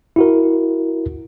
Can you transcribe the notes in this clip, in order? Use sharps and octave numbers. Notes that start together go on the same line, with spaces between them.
E4 F#4 A#4